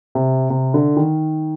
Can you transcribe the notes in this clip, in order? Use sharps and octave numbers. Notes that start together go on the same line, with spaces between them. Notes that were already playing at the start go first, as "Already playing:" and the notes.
C3
C3
D3
D#3